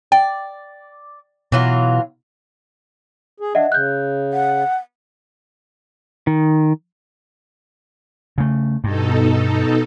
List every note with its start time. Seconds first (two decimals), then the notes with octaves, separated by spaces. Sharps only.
0.12 D5 G5
1.52 B2 E3 F#3 F4
3.40 G#4
3.55 D4 D#5 E5 F#5
3.72 C#3 F#6 G6
4.33 F#5
6.27 D#3
8.38 C#3 A3
8.84 G2 B2 D#4 A4